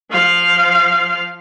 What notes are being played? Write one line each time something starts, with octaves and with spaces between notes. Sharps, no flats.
F3 F5